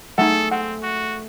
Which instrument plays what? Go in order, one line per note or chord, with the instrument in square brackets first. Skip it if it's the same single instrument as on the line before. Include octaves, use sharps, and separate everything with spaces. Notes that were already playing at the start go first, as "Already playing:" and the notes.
[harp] A3 G#4 [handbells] D#4 F#5 [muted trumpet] A4
[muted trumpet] C4 [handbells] F#5
[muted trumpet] F#4